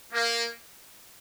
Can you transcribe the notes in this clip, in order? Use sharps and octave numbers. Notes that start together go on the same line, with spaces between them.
A#3